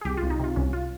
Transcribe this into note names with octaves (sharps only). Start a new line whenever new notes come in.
G#4
C2 G4
F4
C2
D#4
C3 F4
C2 C#4
F4